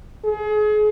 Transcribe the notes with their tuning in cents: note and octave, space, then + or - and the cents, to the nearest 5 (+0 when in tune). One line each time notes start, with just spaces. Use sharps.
G#4 +35